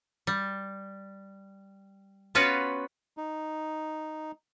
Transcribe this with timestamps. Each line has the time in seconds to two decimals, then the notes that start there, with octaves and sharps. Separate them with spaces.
0.27 G3
2.35 B3 C#4 F4 F#4 B4
3.17 D#4